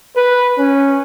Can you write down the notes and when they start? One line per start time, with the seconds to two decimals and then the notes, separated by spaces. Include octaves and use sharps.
0.16 B4
0.58 C#4